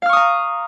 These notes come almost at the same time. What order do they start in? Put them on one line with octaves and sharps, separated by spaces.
F5 F6 C#6 D#6 A#5